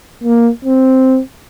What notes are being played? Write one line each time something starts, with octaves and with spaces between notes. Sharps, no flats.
A#3
C4